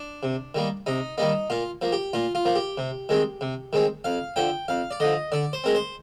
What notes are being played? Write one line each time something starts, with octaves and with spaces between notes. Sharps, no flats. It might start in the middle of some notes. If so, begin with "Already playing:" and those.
Already playing: D4
C3
D#3 G3 A#3
C3 D#4
D#3 G3 A#3 D#4
A#2 F4
F3 A#3
G4
A#2 F4
F4
F3 A#3
G4
C3
D#3 G#3 C4
C3
D#3 G#3 C4
F2 F5
D3 F3 G5
F2 F5
D5
D3 F3 D#5
D3 D5
C5
G#3 C4 A#4
C5